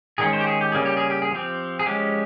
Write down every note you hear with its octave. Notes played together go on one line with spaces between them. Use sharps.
D#3 G#3 C#4 G#4
C5
G4
G#4
G4
C#3 G3 A#3 C#4 G#4
G4
G#4
G4
G#4
F3 C4 G4
G#4
F3 G#3 C#4 G4